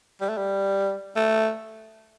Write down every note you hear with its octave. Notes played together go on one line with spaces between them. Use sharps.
G3
A3
G3
A3